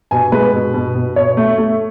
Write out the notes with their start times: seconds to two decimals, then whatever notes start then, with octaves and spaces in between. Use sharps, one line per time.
0.11 B2 G#5
0.32 G#3 B4
0.53 B2
0.74 B2
0.95 B2
1.16 B2 C#5
1.37 A3
1.58 A3